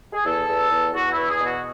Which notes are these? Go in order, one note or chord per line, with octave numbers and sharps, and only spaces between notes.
G#4
E2 A4
E2
E2
E2 F#4
E2 E4
G#4
B2
F#4